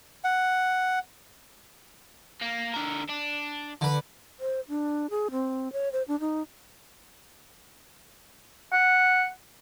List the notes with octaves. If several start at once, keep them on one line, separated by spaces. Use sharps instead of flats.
F#5
A#3
D3 A#4
D4
D3 B4
C5
D4
G#4
C4
C#5
C5
D4
D#4
F#5